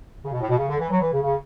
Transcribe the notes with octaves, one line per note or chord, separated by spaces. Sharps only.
C#3
B2
A2
B2
C#3
D3
E3
F#3
E3
C#3
C#3